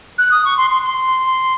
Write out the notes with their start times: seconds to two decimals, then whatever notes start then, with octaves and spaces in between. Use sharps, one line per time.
0.18 F#6
0.31 D#6
0.45 C#6
0.57 C6
0.70 C6
0.83 C6